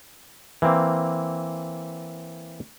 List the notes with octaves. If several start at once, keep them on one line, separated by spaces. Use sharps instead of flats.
E3 A#3 C4